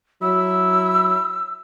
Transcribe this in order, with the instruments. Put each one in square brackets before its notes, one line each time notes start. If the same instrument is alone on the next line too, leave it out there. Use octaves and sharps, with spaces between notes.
[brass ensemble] F#3 [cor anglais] E4 [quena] E6